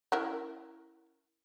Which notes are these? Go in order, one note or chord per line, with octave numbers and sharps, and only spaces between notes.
C#4 E4 A#4